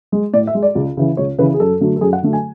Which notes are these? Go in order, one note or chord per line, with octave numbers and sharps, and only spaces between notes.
G#3
A2 D5
E5
G#3
D5
C#2
C#3 E3
C#2 C#5
C#3 E3 B4
G#4
F#2 A4
D3 F#3 A3
A4
F#2 G#4
F#5
D3 F#3 A3
G#5